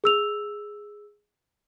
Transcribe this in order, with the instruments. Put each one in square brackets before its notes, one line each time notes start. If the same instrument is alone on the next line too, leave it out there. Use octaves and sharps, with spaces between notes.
[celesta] G#4 E6 F7